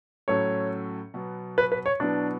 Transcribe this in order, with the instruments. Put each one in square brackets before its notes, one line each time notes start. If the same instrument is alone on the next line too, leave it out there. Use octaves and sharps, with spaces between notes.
[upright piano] A2 F#3 C#4 E4 A4 [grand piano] C#5
[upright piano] B2 F#3 B3
[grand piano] B4
B4
C#5
[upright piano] B2 F#3 B3 E4 [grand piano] D4